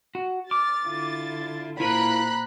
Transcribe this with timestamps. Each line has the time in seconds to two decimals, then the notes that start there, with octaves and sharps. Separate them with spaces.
0.15 F#4
0.51 D6 F6 A6
0.86 D3 E4 F4
1.80 A#2 E4 F4 A#4 C5 A#5 B5 F#6